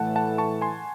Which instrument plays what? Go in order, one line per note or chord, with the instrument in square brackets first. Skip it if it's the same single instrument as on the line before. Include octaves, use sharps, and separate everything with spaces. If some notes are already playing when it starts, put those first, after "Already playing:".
Already playing: [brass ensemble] A2 E3 A3 [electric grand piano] F#5 A5
[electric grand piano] F#5 A5
A5 C#6
G#5 C6